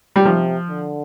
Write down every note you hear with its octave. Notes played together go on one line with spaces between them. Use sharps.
G3
C3 F3
D3